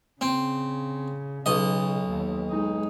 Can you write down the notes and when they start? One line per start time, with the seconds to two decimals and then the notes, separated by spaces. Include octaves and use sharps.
0.21 C#3 C4
1.46 B1 C#3 D#5
2.08 D#2
2.49 G#3 D#4